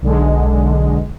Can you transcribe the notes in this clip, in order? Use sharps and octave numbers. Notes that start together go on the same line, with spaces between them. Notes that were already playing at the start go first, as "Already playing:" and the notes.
B1 D3 G#3